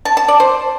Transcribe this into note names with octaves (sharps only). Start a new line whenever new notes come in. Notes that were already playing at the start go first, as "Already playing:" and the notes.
A5
A5
D5
C5